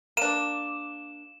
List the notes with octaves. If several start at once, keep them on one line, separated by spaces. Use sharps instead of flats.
A#3 D4 D#7 E7